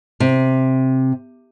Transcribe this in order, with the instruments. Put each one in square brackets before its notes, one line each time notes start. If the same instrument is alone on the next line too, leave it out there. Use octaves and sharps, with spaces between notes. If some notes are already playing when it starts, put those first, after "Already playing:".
[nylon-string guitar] C3